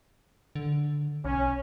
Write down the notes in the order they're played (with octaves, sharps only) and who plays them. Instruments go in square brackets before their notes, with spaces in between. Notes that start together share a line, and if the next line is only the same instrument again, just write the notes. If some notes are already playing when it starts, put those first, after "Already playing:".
[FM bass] D3
[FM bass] B1 [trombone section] C#4